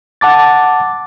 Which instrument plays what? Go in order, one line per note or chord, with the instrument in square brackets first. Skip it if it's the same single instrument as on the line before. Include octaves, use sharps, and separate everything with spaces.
[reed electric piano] F#5 A5 D6 A6